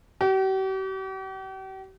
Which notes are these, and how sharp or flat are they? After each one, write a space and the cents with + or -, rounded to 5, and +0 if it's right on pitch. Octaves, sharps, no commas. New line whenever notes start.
G4 -45